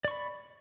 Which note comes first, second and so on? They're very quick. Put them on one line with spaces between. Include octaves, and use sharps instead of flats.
D5 C#6 B5